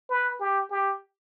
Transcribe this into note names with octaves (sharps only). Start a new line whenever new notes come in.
B4
G4
G4